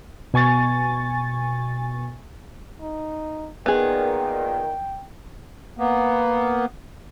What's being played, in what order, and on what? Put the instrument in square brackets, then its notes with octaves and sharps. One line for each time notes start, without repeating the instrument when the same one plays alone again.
[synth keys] B2 G#5 C#6 A6
[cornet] D#4
[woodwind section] A#2 D#3 [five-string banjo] B3 G#4 [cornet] G5
[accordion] A#3 B3